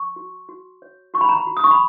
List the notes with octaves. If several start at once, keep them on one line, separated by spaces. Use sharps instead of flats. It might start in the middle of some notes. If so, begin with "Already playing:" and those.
Already playing: C#6
F#4
F#4
C#5
F#4 C#6
B5
A#5
B5
F#4
D#6
C#6
B5